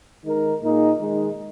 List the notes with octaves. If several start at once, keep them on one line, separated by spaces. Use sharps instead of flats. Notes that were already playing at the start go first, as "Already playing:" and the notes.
D#3 G#3 D#4 A#4
A#2 A#3 D#4 G#4
D#3 G#3 D#4